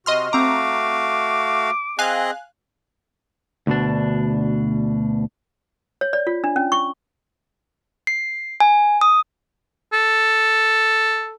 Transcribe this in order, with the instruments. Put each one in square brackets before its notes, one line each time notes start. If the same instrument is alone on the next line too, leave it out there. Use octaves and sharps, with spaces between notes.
[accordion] C3 F#4 [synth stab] D#5 C6 F6
[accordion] A3 F#4 F5 [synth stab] C4 A#5 [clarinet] D6
[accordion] C4 G#4 D#5 [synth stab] F5 G#5 F#6
[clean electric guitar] D2 B2 D4
[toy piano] C#5
D5
F4
D4
C#4
C#6
[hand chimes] C7
G#5
D#6
[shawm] A4